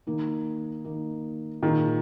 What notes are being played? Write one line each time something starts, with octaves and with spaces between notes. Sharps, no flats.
D#3 A#3 D#4
D#3 A#3 D#4
A#2 D#3 A#3 F4 G#4